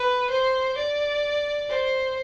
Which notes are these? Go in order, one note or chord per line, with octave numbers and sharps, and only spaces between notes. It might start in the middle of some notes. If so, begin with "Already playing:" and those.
Already playing: B4
C5
D5
C5